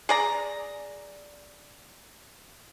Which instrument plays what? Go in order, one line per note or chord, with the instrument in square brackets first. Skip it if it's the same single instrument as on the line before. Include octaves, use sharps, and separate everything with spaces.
[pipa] G#4 D5 A#5